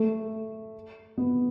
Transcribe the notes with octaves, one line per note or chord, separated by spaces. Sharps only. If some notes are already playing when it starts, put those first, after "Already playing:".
Already playing: A3
B3